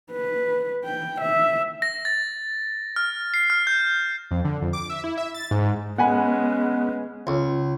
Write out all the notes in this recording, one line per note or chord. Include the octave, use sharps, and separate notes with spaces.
B4
G5
E5
A#6
A6
F6
C7
F6
G6
F2
D3
F2
D6
E5
E4
E5
A6
G#2
G#3 B3 C#4 F#5 G#5 B5
C#2